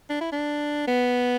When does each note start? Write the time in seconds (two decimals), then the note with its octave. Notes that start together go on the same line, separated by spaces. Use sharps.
0.10 D4
0.21 E4
0.32 D4
0.87 B3